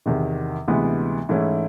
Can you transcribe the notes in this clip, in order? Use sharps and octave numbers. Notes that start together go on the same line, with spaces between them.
E2 C3 D#3
D2 C3 E3 G#3 B3
G#2 E3 A3 C#4 E4